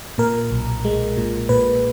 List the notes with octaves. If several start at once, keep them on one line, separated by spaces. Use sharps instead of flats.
A#2 A#4
B1
G#3
A#2
A#2 B4